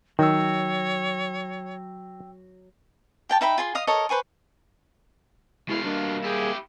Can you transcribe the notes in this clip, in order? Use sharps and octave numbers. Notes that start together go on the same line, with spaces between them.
D#3 F#3 C#5 G5 E6
G4 G5 A5
D#4 E5 G5 B5
F4 G#4 C6
D#5 F5 D#6
A4 A#4 C#5 D#5
B4 C5 G#5 C#6
B2 G#3 B3 E4 F5
G3 A#3 D4
E4 G4 G#4